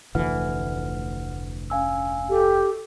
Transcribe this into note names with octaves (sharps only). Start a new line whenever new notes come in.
F1 D2 E3 F#5 F6
C#4 F5 G#5 E6
G4 A4